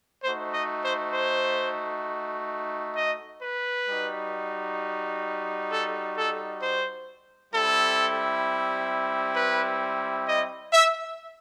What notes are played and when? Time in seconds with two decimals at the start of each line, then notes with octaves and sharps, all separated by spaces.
0.22 A3 D#4 F#4 C5
0.53 D#5
0.83 C5
1.14 C5
2.96 D#5
3.42 B4
3.88 G3 D#4 F#4
5.70 A4
6.16 A4
6.61 C5
7.52 G3 C4 E4 A4
9.35 B4
10.26 D#5
10.71 E5